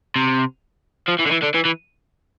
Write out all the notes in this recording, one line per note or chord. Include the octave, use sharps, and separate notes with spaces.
C3
F3
E3
D3
E3
D3
E3
E3